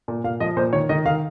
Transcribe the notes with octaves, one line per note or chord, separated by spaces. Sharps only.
A#2
A#2 F5
F3 D#5
A#2 C5
D#3 C#5
D#3 D#5
D#3 F5